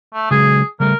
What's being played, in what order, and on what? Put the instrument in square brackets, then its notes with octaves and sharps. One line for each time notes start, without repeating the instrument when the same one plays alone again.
[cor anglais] A3
[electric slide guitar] C#3 F#3 G#3 [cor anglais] G#4
[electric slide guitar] C#3 G3 A3 [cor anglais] A#4